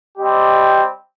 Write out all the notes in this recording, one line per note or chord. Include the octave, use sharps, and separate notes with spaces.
G3 C4 G4 D#5